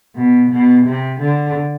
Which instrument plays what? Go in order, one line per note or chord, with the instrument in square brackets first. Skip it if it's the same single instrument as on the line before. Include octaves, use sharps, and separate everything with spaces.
[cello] B2
B2
C3
D3